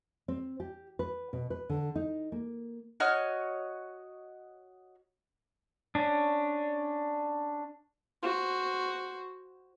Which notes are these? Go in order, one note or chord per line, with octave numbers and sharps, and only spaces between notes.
C4
G4
B4
B2
B4
D3
D#4
A#3
F#4 C#5 D#5 F6
C#4 D4
F#4 C5